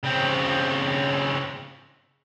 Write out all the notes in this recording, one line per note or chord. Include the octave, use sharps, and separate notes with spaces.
C#3 C4